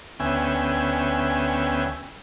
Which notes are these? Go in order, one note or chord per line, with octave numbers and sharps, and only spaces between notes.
D2 B3 C#4 E5 G5 G#5